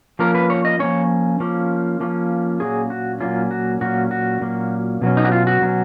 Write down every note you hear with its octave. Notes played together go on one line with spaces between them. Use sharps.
F3 A#3 C#4 A#4
B4
C#5
D#5
F3 A#3 C#4 C#5
F3 A#3 C#4
F3 A#3 C#4
A#2 F#3 A#3 C#4 G#4
F#4
A#2 F#3 A#3 C#4 F4
F#4
A#2 F#3 A#3 C#4 F#4
F#4
A#2 F#3 A#3 C#4
B2 F#3 C#4
D#4
F#4
F4
F#4
B2 F#3 C#4